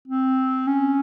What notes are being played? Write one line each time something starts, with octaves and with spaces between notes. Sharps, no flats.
C4
C#4